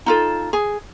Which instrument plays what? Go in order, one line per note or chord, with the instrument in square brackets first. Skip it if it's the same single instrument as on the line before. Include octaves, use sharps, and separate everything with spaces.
[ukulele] D#4 F4 A4
G#4